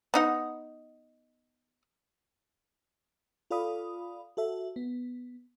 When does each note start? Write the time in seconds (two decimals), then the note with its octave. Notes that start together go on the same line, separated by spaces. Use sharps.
0.14 B3 D#4 F#5
3.51 F4 A4 D5 F5 B5 D#6
4.37 F#4 A4 E5
4.76 B3